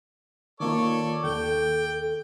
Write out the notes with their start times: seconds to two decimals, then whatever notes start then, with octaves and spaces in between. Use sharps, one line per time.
0.60 D#3 A#3 F4 A4 C#5 D5
1.24 D#2 A4 G5